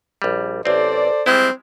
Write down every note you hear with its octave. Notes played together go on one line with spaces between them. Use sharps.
A#1 G3
A1 C4 A4 C5 D5
G3 G#3 C4 E4